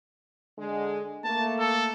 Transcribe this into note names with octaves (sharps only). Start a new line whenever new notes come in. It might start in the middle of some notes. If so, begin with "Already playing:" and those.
D3 G#3
A3 A#3 A5
A4